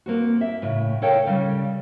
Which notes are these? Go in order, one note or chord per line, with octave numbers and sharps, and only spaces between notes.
A#3 C4 F#4
E5
A2 C#3
A4 A#4 C#5 F5 G5
C#3 G3